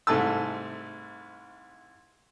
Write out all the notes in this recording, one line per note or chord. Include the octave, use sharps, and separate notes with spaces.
C2 G#2 A3 G#5 A5 E6